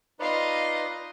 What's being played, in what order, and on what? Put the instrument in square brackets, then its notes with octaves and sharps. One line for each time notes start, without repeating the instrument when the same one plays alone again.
[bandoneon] D#4 B4 D5 [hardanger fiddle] F4 D#5